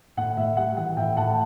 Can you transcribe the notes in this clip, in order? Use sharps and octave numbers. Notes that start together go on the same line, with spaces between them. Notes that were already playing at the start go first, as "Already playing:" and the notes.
A2 F#5
A2 E5
G3 F#5
E3 F#5
A2 E5 G5
A2 F#5 A5